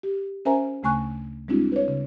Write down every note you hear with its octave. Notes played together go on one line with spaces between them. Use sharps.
G4
C#4 A#4 C5 E5 G#5 A#5
D2 C#3 A3 G#5 C#6 F#6
G3 G#3 C4 D4 E4 F#4
B4 C#5
C#3